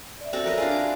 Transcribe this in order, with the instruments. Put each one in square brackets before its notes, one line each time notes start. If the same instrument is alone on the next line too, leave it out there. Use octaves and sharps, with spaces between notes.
[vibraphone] D5 E5
[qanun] C4 F#4 A4
A#4 B4 C#5
D4 F4 G#4
D6